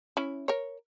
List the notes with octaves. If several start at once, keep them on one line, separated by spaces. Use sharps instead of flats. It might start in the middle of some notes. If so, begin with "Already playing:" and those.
C#4 E4
A#4 C#5